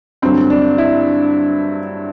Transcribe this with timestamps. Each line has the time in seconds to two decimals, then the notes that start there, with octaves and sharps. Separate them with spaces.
0.22 G2 D3 F#3 C4
0.50 D4
0.78 E4